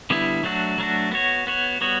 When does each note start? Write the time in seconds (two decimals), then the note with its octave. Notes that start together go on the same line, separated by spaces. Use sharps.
0.10 D3 G3 B3 E4
0.43 F#3 A3 D4 F#4
0.78 F#3 A3 D4 F#4
1.12 B3 F#4 C#5
1.47 B3 F#4 C#5
1.81 G3 B3 F#4 C#5